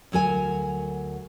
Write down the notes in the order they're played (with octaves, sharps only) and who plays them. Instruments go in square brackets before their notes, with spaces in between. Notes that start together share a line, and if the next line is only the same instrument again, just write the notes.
[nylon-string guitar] D2 F#3 A#4 G#5